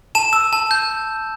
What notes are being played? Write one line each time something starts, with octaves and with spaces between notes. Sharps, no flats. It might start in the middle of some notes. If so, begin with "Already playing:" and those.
A5 E7
E6
A5
G6